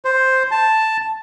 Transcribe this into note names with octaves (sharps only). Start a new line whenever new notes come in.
C5
A5